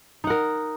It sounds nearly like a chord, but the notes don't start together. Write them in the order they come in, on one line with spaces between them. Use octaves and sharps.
D#4 F#5 A#4